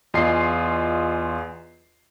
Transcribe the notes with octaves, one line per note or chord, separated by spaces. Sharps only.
E2 F4 D#5 G#5 C7